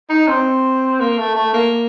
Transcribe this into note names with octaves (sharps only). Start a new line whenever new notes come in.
D#4
C4
A#3
A3
A3
A#3